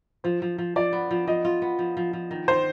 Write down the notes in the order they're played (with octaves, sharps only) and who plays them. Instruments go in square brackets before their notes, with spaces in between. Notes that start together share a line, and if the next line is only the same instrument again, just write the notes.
[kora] F3 [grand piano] C5
[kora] F3
F3
[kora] F3 [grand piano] D5
[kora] B3
F3
[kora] F3 [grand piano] D#5
[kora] F4
B3
F3
F3
F3
D#3
[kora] D#3 [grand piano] C5